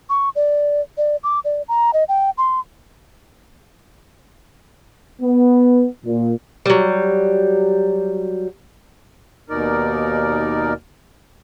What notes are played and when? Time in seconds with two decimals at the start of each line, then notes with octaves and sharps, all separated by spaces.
0.10 C#6
0.36 D5
0.98 D5
1.24 D6
1.45 D5
1.68 A#5
1.94 D#5
2.09 G5
2.38 C6
5.22 B3
6.05 A#2
6.66 F#3 G3
9.50 D#2 B2 D#4 A#4 D5